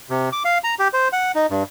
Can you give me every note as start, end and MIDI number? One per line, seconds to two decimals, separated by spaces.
0.10 0.29 48
0.32 0.43 86
0.45 0.58 77
0.64 0.75 82
0.79 0.88 67
0.93 1.08 72
1.13 1.32 78
1.35 1.46 63
1.50 1.63 43